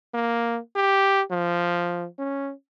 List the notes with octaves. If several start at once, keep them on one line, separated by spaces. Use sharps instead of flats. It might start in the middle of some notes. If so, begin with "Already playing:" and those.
A#3
G4
F3
C#4